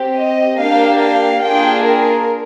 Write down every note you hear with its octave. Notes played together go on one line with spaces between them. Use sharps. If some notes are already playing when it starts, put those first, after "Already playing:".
Already playing: C4 G4
D#5
A#3 D4 G4 F5
F5
A#3 D4 F4 G#4 G5
A#4